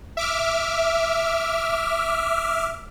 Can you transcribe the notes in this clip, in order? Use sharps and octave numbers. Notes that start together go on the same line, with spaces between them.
E5 D6 F6